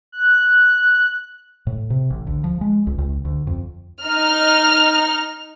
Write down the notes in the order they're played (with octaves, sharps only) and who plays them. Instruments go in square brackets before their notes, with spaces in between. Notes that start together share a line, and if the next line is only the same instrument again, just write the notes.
[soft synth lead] F#6
[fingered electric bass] A2
C3
A1
D2
F3
G#3
C#2
C#2
D2
F2
[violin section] D#4 F6